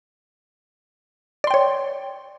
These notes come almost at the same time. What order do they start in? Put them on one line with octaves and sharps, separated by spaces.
D5 C6 G5 C#5